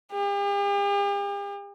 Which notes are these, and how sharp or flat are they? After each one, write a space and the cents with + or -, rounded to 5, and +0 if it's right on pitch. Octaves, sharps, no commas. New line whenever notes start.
G4 +45